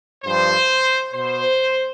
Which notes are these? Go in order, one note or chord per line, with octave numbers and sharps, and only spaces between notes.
G2 F3 C5
B2 C5